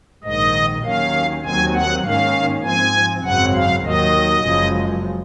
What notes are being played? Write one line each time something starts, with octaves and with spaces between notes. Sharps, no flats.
A#1 G#2 D#3 D#5
D#2 D#3 F#3 C#4 F5
D#2 D#3 F#3 C4 G#5
F#5
G#2 D#3 A#3 C#4 F5
G#2 F3 C4 G#5
G#1 F#2 C#3 F#3 C4 F#5
F5
D#2 D#3 F#3 D#5
F#1 F#2 C#3 F3 G#3